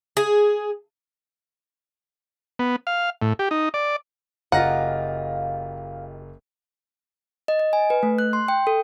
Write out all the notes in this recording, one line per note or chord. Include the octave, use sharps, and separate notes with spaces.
G#4
B3
F5
A2
G4
D#4
D5
F#1 F4 G4 D#5 F5 F#5 A#5 A#6
D#5
D#5
G#5
B4
A3
F#6
C6
G5
A4